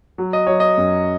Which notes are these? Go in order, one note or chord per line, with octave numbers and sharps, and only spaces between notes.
F#3
D#5
F#3 C#5
D#5
F#2